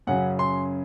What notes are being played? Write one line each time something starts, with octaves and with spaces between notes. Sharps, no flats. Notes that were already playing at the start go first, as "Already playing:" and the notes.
F#2 C#3 F#3 C#4 F#5
C6